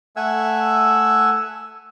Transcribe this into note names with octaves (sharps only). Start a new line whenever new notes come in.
A3 E5 F#5 G#5 E6